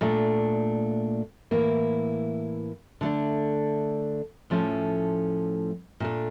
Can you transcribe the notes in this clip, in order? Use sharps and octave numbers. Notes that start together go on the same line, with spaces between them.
A#2 A3 D4
A2 E3 A#3 E4
D3 A3 D4
A2 F3 A3 C#4
A#2 A3 D4